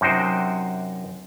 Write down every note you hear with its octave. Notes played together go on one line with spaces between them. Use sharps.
F#2 C3 D#4 F#4 C5 G5